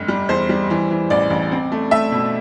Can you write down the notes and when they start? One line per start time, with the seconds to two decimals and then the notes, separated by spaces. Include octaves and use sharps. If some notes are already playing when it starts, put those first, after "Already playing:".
Already playing: F1 G2
0.08 G3
0.29 E2 C5
0.49 G3
0.70 E3
0.91 E3
1.10 A1 D5
1.30 A1
1.52 C4
1.72 A3
1.91 A3 E5
2.12 B2